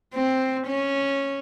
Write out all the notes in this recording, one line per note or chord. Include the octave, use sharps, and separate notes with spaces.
C4
C#4